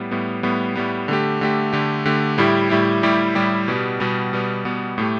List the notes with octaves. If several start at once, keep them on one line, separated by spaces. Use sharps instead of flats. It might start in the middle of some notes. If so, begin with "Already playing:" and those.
Already playing: A2 G3 B3
A2 G3 B3
A2 G3 B3
A2 G3 B3
D3 A3 G4
D3 A3 G4
D3 A3 G4
D3 A3 G4
A2 G3 E4 G4
A2 G3 E4 G4
A2 G3 E4 G4
A2 G3 E4 G4
B2 G3 B3
B2 G3 B3
B2 G3 B3
B2 G3 B3
A2 A3 G4